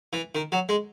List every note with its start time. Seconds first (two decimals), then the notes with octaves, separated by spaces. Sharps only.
0.13 E3
0.35 D#3
0.52 F#3
0.69 G#3